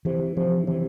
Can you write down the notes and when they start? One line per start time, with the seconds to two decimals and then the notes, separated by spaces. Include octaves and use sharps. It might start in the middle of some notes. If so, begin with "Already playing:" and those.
0.05 C3 E3
0.37 C3 F3
0.67 C3 E3